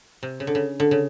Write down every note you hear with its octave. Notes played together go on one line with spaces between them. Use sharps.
C3
C#3
D3
C#3
D3
C#3